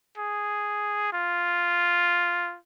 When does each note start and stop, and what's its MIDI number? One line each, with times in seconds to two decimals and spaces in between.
0.18 1.11 68
1.13 2.57 65